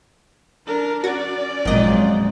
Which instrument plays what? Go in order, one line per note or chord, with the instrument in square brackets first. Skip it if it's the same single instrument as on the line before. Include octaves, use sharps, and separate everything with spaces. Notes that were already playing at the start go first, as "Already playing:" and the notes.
[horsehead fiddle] D4 A#4
[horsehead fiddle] C#4 D5 [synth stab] F#4
[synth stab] G#1 D#5 [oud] F2 A#2 [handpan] F3 F#3 G#3